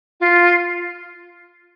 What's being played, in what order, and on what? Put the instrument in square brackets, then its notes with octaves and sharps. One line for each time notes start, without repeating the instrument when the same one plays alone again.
[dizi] F4